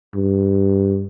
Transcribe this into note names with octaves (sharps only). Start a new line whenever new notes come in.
G2